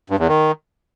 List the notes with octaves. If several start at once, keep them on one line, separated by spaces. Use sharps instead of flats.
G2
E2
D#3